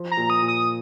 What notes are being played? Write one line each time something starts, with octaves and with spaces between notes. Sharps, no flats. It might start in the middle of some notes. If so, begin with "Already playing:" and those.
Already playing: F3
A#5
A#2
D#6
A#2
D#6